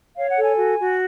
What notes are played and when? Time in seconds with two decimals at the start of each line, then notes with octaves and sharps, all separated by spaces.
0.16 C#5 F5
0.30 F#5
0.38 A4
0.43 G#5
0.57 F#4
0.79 F#4